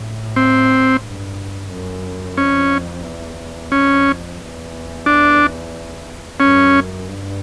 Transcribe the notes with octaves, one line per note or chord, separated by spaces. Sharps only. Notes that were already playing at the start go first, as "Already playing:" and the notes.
Already playing: A2
C4
G2
F#2
F2 C#4
E2
F2 C#4
E2
D4
F#2 C#4
G2